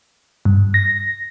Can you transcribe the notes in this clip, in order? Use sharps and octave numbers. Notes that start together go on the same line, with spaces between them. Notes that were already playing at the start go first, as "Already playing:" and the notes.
G2
A#6